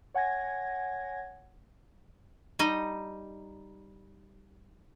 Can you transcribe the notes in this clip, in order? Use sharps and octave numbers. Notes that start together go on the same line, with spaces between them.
C#5 F#5 G#5 G#6 A#6
G3 D#4 D#5